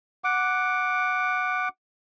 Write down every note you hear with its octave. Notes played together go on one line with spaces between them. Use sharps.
F#5 D6